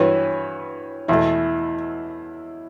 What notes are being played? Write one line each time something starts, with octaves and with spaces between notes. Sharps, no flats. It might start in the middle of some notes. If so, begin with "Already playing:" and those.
Already playing: G2 E3 B3 F#4 C#5
E2 B2 A3 E4